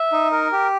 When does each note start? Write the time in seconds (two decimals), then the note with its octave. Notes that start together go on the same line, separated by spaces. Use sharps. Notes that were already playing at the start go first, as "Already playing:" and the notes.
Already playing: E5
0.12 D#4
0.32 A#4
0.52 G4